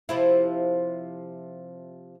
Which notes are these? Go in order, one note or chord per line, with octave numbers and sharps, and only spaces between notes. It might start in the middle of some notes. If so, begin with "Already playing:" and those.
C3 F3 E4